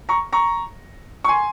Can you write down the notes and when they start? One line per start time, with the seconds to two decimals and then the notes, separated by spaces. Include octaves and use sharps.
0.09 A#5 C#6
0.33 A#5 C#6
1.24 C#6
1.28 G#5 C6